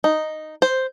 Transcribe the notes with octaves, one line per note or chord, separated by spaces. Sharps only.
D#4
C5